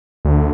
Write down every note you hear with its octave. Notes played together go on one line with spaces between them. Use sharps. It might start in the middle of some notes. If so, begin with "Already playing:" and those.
D2